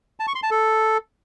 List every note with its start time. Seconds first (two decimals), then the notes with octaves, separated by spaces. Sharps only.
0.20 A5
0.27 C#6
0.35 C6
0.43 A5
0.51 A4